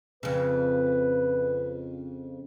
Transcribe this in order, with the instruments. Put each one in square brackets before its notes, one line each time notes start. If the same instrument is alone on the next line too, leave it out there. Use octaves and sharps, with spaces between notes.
[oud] F2 C#3 [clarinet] B4